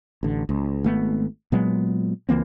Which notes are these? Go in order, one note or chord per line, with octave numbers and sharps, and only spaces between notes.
A1 D3
C#2
G#1 A3 B3
A#2 F#3 G#3 B3
C#2 E3 A#3 C4